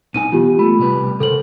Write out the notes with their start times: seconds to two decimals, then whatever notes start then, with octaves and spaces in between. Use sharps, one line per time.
0.14 B1 D#4 G#5 D#7
0.32 E3 B3 F4 G4
0.59 A3 B5
0.79 C3 G3 B4
1.20 C#3 A4 A#4 C5 F#7